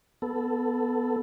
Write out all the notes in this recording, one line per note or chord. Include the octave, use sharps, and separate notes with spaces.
B3 A4